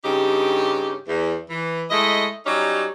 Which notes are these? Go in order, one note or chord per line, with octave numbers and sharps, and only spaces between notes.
G2 C#3 D#4 G4
E2
E3
G#3 A3 E4 D#5
F#3 G3 C#4 D#4 G4